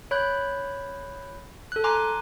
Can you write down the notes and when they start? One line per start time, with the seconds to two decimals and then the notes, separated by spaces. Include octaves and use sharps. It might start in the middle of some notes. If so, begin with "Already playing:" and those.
0.11 C#5 B5 F#6 G6
1.72 A4 F#6
1.84 G#5 A#5 C6 D6 F#6